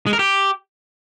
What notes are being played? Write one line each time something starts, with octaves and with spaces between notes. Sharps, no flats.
G#3
A#4
G4